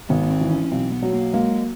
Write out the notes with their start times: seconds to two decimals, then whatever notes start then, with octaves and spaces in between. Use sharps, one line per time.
0.10 G#1 B3
0.23 B3
0.31 C4
0.41 E3
0.51 C#4
0.64 C#4
0.72 B1 C4
0.92 B3
1.03 F#3
1.13 A#3
1.33 G#3 A#3